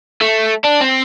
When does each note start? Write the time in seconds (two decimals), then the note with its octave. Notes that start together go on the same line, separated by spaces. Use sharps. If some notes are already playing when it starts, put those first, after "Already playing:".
0.21 A3
0.64 D4
0.80 C4